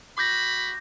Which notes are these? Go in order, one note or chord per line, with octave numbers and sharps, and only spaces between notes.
F#4 B5 D6 G6 A#6